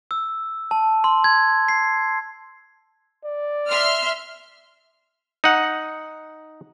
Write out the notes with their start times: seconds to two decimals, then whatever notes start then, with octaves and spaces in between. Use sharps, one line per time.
0.11 E6
0.71 A5
1.04 C6
1.24 G#6
1.68 C7
3.24 D5
3.70 E5 C6 F6
5.44 D#4 F#5